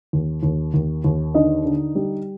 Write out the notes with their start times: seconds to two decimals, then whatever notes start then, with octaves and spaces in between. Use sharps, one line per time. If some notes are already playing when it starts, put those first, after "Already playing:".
0.13 D#2
0.43 D#2
0.74 D#2
1.04 D#2
1.34 D3 D#4 D#5
1.65 D3
1.95 G3